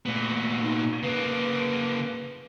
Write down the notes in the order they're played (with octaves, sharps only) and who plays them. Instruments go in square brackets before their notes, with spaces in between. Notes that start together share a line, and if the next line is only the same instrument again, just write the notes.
[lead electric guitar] A#2 B3 [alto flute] A3
[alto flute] D#4
[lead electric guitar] C#3 A#3 [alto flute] B4